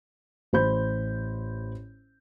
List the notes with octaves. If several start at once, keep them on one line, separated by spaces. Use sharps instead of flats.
A1 C5 B5 G6